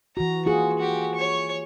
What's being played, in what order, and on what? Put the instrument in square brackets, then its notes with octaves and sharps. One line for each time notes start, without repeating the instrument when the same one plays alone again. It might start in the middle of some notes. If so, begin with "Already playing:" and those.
[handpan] E3 F#4 [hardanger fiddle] A#5
[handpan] A#3 F4 G#4 [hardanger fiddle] F#4
[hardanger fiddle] F#4 G4
C#5 C#6